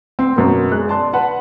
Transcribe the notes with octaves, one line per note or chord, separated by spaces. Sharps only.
C4
F#2 B2 B3 A#4
G#3 F#6
D5 A5 C6
B4 F#5 A5